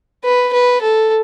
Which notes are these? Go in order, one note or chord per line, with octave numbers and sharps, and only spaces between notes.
B4
B4
A4